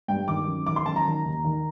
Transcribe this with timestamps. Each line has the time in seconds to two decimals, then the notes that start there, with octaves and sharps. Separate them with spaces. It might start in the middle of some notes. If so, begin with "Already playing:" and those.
0.08 G2 G5
0.28 D#3 D6
0.47 F#2
0.66 D#3 D6
0.76 C6
0.86 F#2 A5
0.96 A#5
1.05 D#3
1.25 D#2
1.45 D#3